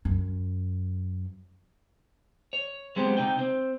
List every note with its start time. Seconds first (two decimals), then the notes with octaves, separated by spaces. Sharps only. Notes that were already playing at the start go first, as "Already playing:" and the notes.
0.05 F#2
2.53 C#5
2.96 F#3 G#3 B3 C4 G4
3.17 C3 D#4 G5
3.39 C4